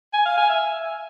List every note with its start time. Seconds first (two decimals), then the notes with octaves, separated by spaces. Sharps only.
0.13 G#5
0.25 F5
0.37 G#5
0.49 E5